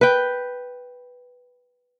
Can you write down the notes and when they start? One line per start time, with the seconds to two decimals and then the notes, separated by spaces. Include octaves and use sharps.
0.01 B4 G5